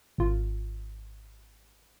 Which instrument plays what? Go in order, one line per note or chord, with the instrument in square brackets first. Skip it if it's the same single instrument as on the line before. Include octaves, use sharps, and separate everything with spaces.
[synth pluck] G#1 F4